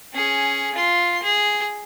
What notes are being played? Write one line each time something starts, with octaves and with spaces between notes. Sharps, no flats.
C#4 G#4
F4 C6
G#4